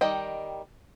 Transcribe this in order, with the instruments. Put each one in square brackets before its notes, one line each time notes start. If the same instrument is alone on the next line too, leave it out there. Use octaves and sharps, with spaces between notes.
[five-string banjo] D#3 G3 D#5 G5